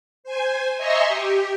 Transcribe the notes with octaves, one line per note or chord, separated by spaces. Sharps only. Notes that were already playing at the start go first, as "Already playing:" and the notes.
C5 G#5
D#5 E5 G#5 A#5 C6 C#6
G4